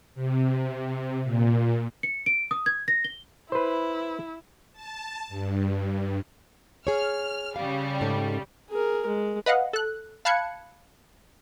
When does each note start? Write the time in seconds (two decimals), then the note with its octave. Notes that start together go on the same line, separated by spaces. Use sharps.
0.15 C3
1.24 A#2
2.03 C#7
2.26 D7
2.51 D#6
2.66 G#6
2.88 A#6
3.04 G7
3.52 E4 B4 C5
4.72 A5
5.28 G2
6.87 G#4 C#5 F6
7.56 C#3 G3 F5
8.01 G#2 C#4 A4
8.69 G#4 A#4
9.07 G#3
9.46 B4 D#5 F5 F#5
9.73 A4 F#6
10.25 F5 A5 B5 F#6 G#6 C#7